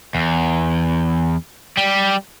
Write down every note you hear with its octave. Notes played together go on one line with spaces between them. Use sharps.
E2
G3